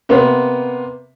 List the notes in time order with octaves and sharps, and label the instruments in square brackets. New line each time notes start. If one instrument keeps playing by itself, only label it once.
[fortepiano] C3 A#3 B3